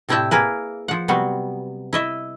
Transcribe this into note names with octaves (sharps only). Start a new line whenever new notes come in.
A2 C3 E4 D5 G5 A5
A#3 G#4 A#4 B4
F3 F#5
C3 F#3 G3 B3
E4 D#5 E5